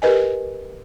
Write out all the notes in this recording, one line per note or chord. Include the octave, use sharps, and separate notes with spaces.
G4 A#4 B4 D#5 G#5